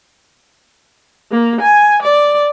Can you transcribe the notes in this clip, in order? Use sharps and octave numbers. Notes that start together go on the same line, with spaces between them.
A#3
G#5
D5